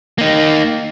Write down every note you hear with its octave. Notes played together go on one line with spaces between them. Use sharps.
A#3 D#4